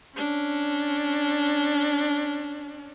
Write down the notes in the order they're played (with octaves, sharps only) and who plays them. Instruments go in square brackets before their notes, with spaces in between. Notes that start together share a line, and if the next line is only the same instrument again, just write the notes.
[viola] C#4 D4